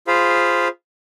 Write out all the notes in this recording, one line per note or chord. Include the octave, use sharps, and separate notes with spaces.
F4 G#4 C5 F5 B5